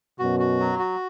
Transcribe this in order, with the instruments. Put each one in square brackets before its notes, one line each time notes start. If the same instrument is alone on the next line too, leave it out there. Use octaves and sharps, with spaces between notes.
[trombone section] F#2 B2 [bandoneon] F#4
[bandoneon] F#4
F#3
F#4